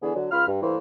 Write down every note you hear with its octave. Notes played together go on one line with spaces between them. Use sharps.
D3 E3 B3 D4 G#4
D3 F#3
C#2 F4 B5 F6
G2
G2 E3 A3 A#3 A#4 C5